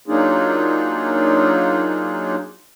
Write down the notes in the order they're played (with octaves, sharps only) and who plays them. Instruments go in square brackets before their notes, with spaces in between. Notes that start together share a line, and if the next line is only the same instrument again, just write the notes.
[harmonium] F#3 A#3 D4 D#4 F4 G#4